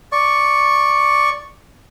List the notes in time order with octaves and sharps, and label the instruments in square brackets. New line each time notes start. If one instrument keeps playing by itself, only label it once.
[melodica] D5 C#6